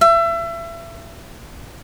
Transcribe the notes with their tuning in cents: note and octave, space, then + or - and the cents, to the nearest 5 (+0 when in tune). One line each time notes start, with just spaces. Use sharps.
E5 +30